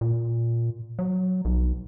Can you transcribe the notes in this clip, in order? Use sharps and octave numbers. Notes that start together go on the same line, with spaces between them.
A#2
F#3
B1